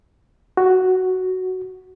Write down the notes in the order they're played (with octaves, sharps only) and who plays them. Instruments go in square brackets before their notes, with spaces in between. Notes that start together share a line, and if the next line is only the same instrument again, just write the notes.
[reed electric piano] F#4